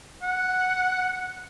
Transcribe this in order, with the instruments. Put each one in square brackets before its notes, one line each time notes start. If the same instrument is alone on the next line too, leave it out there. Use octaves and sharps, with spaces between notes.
[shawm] F#5